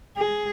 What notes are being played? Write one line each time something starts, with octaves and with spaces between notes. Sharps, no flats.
G#4